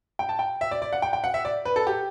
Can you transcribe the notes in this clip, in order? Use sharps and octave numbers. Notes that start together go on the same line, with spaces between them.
G5
A5
G5
E5
D5
D5
F#5
G5
G5
F#5
E5
D5
B4
A4
G4